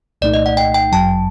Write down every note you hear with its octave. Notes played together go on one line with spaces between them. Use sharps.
C2 A#2 A3 D#4 D5
D#5
F#5
G5
G5
G1 F#2 F#3 A5